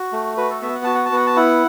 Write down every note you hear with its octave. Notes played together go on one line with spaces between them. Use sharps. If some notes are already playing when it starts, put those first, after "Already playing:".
Already playing: F#4
A3
F#4 B4
A4
B3 E5
F#5
F#4 A5
F#5
A5
B3 F#5
A5
E4 F#5